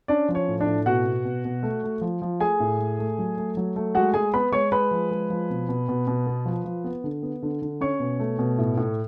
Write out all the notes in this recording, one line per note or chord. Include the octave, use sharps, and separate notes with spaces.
C#4 D4 D5
F3
C#5
A2
D4 D5
A2
B2 F#4 F#5
B2
B2
B2
A3
A3
F3
F3
A3 G#4 G#5
A2
A3
A3
F#3
A3
F#3
A3
G#3 F#4 F#5
G#3 G#4 G#5
B3 B4 B5
G#3 C#5 C#6
G#3 B4 B5
F3
G#3
F3
B2
B2
B2
B2
B3
F3
F3
B3
D3
B3
D3
D3
C#4 C#5 C#6
B2
A3
B2
A2
A2